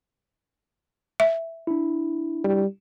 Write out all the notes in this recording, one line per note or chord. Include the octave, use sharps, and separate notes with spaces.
E5
D4 E4
G3